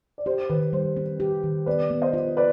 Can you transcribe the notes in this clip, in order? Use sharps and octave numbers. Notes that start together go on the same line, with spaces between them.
D5
G4 C5
D#3 B4
G3 C5
C4
G4
D#3
B3 B4 D5
B3
C5 D#5
F4
B4 D5